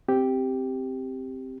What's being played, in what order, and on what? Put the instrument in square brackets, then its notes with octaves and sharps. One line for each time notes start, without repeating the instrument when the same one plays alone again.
[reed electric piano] C4 G4